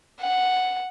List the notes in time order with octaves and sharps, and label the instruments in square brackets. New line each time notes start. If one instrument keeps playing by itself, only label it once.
[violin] F#5